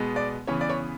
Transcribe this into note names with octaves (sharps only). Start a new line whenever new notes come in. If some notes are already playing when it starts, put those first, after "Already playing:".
Already playing: B2 G#3 B3
D5
C#3 E3 B3 C#5
D5
C#5